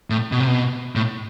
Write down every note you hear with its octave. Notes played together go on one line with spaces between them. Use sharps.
A2
B2
C3
B2
A2